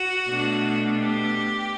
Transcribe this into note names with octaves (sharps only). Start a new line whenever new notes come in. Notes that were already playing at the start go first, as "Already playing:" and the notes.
Already playing: F#4
B2 A3 D4
G4